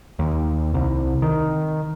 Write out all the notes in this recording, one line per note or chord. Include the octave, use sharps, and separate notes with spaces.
D#2
C2
D#3